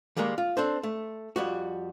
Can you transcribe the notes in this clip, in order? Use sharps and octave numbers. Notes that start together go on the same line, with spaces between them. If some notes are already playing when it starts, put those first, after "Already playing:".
D#3 G3 G#3 A#3 A#4
F4
C4 D4 A4 C5
A3
F2 G3 F#4